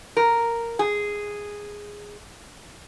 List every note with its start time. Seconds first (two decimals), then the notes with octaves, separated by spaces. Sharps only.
0.17 A#4
0.79 G#4